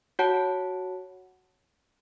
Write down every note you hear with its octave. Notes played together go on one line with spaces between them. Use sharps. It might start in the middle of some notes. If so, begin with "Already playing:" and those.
F#4 C#5 F#5 A5